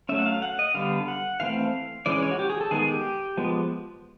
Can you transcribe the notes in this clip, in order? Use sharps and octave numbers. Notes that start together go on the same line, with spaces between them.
F#3 A3 C#4 E5
F#5
F5
F#5
D#5
D3 G3 B3 F5
F#5
E3 A3 C4 F5
E3 G#3 C#4 D5
C#5
F#4
G4
G#4
A4
D#3 G#3 B3 G#4
G4
F3 G#3 B3